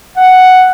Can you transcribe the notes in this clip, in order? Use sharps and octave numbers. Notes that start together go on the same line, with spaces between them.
F#5